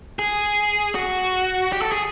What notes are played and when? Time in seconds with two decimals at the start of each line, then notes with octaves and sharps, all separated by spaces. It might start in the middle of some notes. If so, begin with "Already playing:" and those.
0.19 G#4
0.95 F#4
1.72 G4
1.82 A4
1.92 G#4